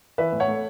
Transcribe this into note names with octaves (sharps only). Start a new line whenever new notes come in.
E3 B4 E5
A2
C#5 F#5
A3